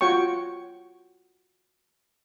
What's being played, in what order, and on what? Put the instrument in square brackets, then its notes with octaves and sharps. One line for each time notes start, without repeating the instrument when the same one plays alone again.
[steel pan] F4 F#4 C#5 G5 C#6